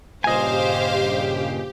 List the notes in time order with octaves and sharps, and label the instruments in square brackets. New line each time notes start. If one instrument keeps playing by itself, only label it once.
[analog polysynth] G2 A#2 C#3 [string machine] G4 [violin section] C5 F5 [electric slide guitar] D#5 G#5